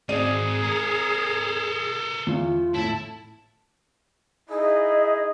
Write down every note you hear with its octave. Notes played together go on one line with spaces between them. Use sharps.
G#1 G#2 C4 G#4 D5 D#7
A4 A#4
E2 F4
A2 E4 A5
D#4 E4 G#4 D#5